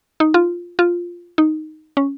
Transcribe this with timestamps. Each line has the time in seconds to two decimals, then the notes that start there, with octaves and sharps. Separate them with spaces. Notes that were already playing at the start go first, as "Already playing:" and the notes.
0.20 D#4
0.34 F4
0.79 F4
1.38 D#4
1.97 C#4